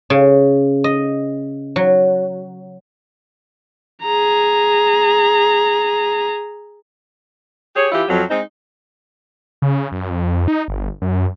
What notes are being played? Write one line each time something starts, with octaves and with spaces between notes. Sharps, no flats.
C#3
D#5
F#3
G#4 A#5
G4 G#4 C#5
E3 E4 F4 G4
F2 F#3
G#3 C4 D#4
C#3
F#2
F2
D#4
G1
F#2